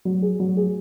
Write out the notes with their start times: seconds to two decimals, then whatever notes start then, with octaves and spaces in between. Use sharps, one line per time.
0.05 F#3
0.22 G#4
0.40 F#3
0.57 G#4